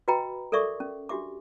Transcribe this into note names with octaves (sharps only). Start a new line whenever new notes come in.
F#4 B4 D#5 G5 A#5 B5
A4 A#4 D5 E5 C#6 D6
C#4
D4 F#4 G4 E5 D6